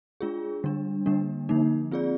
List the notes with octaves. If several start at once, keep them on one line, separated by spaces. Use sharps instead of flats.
G#3 D4 F4 G#4
D3 G3 D4
D3 G3 A#3 D4
D3 F3 A#3 D#4
C4 F4 G#4 D5